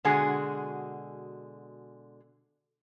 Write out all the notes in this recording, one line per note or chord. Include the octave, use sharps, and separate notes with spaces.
B2 D3 G#3 F#4 G#4